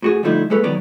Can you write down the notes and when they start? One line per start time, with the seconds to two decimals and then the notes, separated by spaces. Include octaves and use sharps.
0.02 A2 F#4 G#4
0.23 D3 F3 G3 A3 D#4 E4
0.50 G#3 A#3 A4 B4 C#5
0.64 D#3 F#3 B3 D#4 C#5 D5